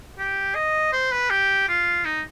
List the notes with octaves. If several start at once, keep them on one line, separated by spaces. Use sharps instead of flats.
G4
D#5
C5
B4
G4
F4
D#4